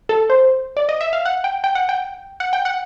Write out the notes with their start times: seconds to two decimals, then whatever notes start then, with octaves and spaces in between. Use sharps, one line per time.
0.09 A4
0.30 C5
0.77 D5
0.89 D#5
1.01 E5
1.13 F5
1.25 F#5
1.44 G5
1.64 G5
1.75 F#5
1.89 G5
2.40 F#5
2.53 G5
2.65 F#5